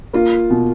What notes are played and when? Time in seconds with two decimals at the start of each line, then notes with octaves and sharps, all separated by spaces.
0.13 A#3 F4
0.50 B2